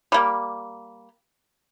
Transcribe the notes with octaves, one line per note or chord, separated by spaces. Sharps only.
G3 A#3